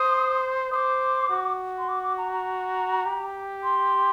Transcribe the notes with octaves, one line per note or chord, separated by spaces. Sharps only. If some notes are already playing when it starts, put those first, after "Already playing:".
Already playing: C5 D#6
C5 D6 D#6
F#4
C6
D6
D6
A#5
A#5
G4
C6